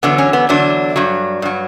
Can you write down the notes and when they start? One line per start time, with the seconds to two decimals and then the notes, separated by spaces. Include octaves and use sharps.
0.03 E2 D3 F#3 B3
0.18 C#4
0.33 B3
0.49 E2 D3 F#3 D4
0.96 G2 F#3
1.42 G2 F#3